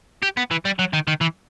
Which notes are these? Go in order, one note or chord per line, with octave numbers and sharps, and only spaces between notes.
G4
B3
E3
G3
F#3
D#3
D#3
E3